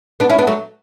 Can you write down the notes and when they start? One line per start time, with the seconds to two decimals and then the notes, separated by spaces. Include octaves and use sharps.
0.20 B3 D4
0.30 C#4 E4
0.39 B3 D4
0.47 F#3 A3